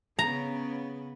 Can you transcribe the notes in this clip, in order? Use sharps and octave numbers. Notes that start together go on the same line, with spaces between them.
C#3 B3 A#5